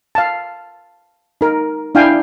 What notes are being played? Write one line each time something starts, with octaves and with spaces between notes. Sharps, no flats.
F5 A5
D#4 A#4
D4 E4 F5 G5 G#5